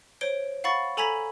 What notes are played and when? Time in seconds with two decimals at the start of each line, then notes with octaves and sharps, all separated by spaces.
0.21 C5 C#5 D7 G7
0.64 F5 F#5 B5 C#6 A6
0.97 A4 G#5 A#5 B5 G#6 B6